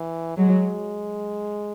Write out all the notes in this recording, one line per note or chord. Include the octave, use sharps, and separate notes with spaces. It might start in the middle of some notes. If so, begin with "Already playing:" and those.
Already playing: E3
F#3 G#3